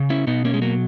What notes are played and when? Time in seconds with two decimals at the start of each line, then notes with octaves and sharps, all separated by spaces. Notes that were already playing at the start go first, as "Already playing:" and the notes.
Already playing: C#3
0.10 C#4 E4
0.27 B2 B3 D#4
0.45 A#3 C#4
0.54 G#3
0.62 F#3 A#3